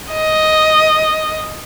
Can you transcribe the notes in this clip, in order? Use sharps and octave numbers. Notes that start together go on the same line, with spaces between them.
D#5